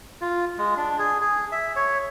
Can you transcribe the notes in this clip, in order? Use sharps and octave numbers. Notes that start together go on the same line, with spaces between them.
F4
G#3
D4
G#4
G#4
E5
C#5